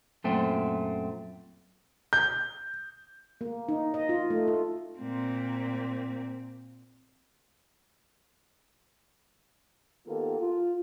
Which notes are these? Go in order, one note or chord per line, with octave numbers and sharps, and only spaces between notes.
F#2 A#2 A3 C4
G6
A#3
D#4
D#5
F4
A3
F4
A#2 C4
D#3 A#3 B3 F4 G4 A4
F4